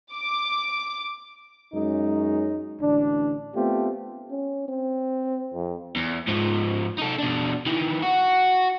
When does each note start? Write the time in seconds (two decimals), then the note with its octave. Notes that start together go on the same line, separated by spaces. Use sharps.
0.15 D6
1.73 F#2 G#3 C#4 D#4
2.81 A1 D3 D4
3.55 A3 B3 C4 F4 G4
4.30 C#4
4.68 C4
5.54 F2
5.96 E2
6.28 G#2 F3
6.98 D#4 A4
7.18 B2 D4
7.66 D#3 E3
8.02 F#4